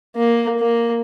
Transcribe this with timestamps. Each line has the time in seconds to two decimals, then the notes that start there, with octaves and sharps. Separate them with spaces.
0.16 A#3
0.60 A#3